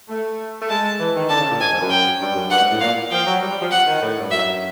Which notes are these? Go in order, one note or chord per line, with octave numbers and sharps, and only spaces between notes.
A3
A3
G#3 A5
E3
D#3
D3 A5
C#3
A#2
G#2 G#5
F2
F#2
G5
G2
F#2
G2 F#5
G#2
A2
A#2 F5
F3 G5
F#3
G3
G3
F3
F#5
D#3
A2
G2
F#2 E5